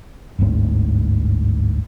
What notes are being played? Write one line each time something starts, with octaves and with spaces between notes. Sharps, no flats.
G1 D2 G#2 C4